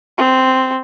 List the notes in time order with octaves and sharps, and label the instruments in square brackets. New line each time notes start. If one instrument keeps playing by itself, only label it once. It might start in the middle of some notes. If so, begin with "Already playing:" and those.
[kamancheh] C4